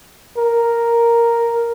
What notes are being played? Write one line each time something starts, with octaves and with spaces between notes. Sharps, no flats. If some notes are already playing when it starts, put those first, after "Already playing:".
A#4